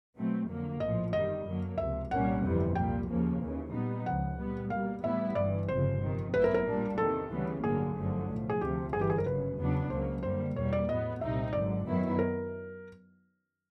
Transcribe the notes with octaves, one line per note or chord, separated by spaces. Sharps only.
B2 F#3 A3 C4
F2 D3 F#3 A#3
A#1 A2 F3 D#5
G1 F#2 D#3 G3 D#5
F#2 D3 F#3 A#3
C#2 C3 F3 E5
C2 A#2 G3 A#3 C#4 F#5
G1 F2 C3 E3 G3
C2 A#2 G3 A#3 G5
D#2 C#3 F3 A#3
D#2 C#3 E3
A#2 G3 B3 D#4
C#2 C#3 F3 F#5
A#2 G3 B3
B2 G3 A#3 F5
A2 E3 G3 B3 E4 E5
G1 G2 E3 D5
G1 F2 C#3 C5
F2 C3 D#3
A1 A2 F#3 B3 E4 B4
A#4
A#4
A#2 G3 A#3 D4
E2 C3 D#3 A4
D2 C#3 E3 G3 B3
A1 G2 D3 F#3 A#3 G#4
G1 F#2 D3 F3 A3
B1 A2 F3
G#4
D2 C3 F3 G4
G1 G2 E3 G#4
G4
G#4
A#4
G1 F#2 C#3 B4
E2 C#3 F#3 B3 D4
C#2 C#3 F#3 A#3 C5
F#2 D3 G3 A#3 C5
E2 B2 G3 A#3 C#5
D5
A2 F#3 B3 D#5
C2 A#2 G3 C4 D#4 E5
G#1 F#2 D3 D5
F#2 D#3 F#3 B3 E4
A#4